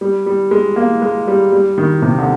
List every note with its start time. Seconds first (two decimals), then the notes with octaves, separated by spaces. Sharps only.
0.01 G3
0.26 G3
0.51 G#3
0.76 A#3
1.02 G#3
1.28 G3
1.52 G3
1.78 D#3
2.02 C3
2.18 D3